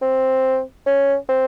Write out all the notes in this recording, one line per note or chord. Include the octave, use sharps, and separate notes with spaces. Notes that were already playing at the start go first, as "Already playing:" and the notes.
C4
C#4
C4